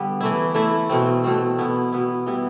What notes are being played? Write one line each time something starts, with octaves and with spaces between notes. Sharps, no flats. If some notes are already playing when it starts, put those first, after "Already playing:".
Already playing: D3 G3 B3
E3 A3 E4
E3 A3 E4
B2 A3 C4
B2 A3 C4
B2 B3 E4
B2 B3 E4
E3 G3 B3 E4